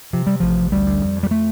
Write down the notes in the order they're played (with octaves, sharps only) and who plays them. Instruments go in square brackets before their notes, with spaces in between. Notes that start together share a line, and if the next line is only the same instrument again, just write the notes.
[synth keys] C3 [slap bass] F3
[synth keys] C3 [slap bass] G3
[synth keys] A1 [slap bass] F3
[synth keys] A1
[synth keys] D2 [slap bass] G3
[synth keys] D2
F2
F2
[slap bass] G3
A3